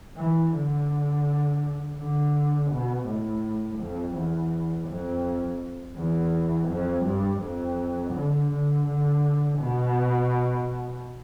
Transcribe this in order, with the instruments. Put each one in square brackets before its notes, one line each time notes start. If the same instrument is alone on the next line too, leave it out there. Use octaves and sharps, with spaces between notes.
[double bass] E3
D3
D3
B2
A2
F2
E2
F2
E2
F2
G2
F2
D3
D3
D3
B2